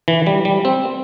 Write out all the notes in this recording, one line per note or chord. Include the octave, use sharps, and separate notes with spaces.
E3
G3
G3
C4